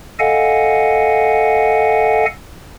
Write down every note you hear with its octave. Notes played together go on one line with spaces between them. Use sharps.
A4 D#5 F5 F#5 G#5